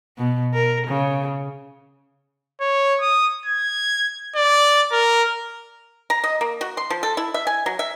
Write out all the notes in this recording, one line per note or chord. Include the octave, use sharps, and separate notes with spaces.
B2
A#4
C#3
C#5
D#6
G#6
D5
A#4
A#5
D#5
A#3
F#4
C6
F3
A4
E4
E5
G#5
F#3
E5